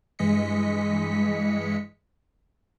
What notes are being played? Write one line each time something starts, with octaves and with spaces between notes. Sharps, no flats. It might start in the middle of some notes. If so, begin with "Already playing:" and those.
G2 E3 G#3 D#5 B6 C#7